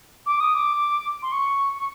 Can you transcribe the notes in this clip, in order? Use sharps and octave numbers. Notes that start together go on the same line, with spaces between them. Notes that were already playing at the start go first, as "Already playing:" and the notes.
D6
D#6
D6
C6
C#6
C#6